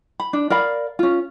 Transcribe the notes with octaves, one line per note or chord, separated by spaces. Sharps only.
B5
D4
A#4 D5 F5 B5
C#4 F4